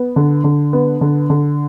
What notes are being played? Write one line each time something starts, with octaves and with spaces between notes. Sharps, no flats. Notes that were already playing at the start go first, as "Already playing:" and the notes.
Already playing: B3
D3
D3
B3
D3
D3